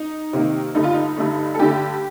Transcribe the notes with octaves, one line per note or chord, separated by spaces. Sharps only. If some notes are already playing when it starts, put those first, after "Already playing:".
Already playing: D#4
C3 D#3 A#3
G2 D3 A3 D#4
F4
D#4
G2 D3 A3
A4
G2 D3 A3 G4